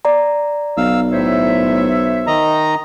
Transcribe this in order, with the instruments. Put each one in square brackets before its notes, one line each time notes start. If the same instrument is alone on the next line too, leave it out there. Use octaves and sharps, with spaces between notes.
[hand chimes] D5 A#5
[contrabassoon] B1 [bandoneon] F5 E6
[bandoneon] A2 [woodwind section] C5 C#5 E5
[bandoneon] D#3 D#5 A#5